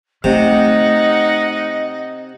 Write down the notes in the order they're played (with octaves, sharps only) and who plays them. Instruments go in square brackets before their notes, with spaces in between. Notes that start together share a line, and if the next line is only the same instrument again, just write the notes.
[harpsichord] C3 [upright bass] A3 [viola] D#4 F#5 [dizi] D#5